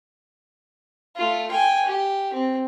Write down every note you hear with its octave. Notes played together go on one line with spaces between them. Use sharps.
A3 F4
G5 G#5
G4
C4